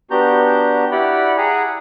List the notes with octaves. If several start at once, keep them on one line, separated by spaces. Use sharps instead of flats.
B3 D4 F#4 G4 A#5 G6
E4 G4 D5 F#5 B5
G#4 F#5 G#5 A#5